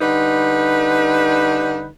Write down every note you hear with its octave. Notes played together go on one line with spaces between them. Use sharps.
D3 G3 D#4 B4